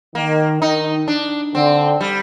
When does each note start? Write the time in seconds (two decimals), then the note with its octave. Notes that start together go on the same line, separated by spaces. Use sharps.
0.15 D#3 A#3
0.61 D#3 D#4
1.08 D4
1.54 D3 C4
2.01 G3